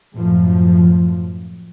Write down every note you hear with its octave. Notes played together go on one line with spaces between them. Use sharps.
F#2 A2 F3